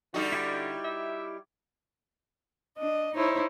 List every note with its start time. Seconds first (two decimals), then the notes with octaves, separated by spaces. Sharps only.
0.14 D3 G3 D#4 F#4
0.32 E4 G4
0.84 E5
2.77 D4 D#5
3.16 D#4 E4 C5 C#5